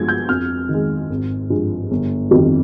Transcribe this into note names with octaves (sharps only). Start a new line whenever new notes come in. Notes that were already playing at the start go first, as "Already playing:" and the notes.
Already playing: G1 G2 F3 G#3 G#6
G6
F2 F6
D#3 G#3
G#1
G2 F3 G#3
G1
F2 D#3 G3